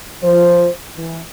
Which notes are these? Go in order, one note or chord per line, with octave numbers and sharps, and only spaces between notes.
F3 C5
E3